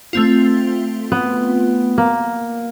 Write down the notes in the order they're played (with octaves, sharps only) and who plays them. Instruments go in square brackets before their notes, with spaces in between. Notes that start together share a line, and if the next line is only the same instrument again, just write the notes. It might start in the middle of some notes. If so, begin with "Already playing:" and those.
[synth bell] A3 C4 F4
[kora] B3
A#3